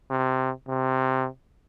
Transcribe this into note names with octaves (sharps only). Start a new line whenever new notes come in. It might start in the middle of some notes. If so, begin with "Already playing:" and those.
C3
C3